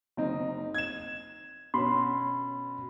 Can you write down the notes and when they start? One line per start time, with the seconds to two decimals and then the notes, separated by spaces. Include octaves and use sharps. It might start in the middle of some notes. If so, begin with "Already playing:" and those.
0.17 F#1 C4 D#4
0.74 G#6 E7
1.74 B2 C#4 B5 C6